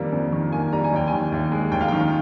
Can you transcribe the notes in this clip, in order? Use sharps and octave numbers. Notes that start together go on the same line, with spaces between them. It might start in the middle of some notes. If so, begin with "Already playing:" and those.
Already playing: F2 D#3 G3 A#3
F2
D#3
A#3 G#5
G3 A#5
G#5
D#2 G5
D#3 G#5
D#2
G#3
D#2 G5
F5
G5
D#3